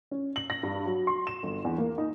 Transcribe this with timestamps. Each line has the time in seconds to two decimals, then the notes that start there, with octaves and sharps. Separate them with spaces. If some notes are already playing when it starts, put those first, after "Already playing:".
0.11 C#4
0.36 F#7
0.50 A#6
0.63 G2
0.86 F#3
1.07 C6
1.27 E7
1.43 G1
1.65 E2
1.78 A#3
1.98 D#4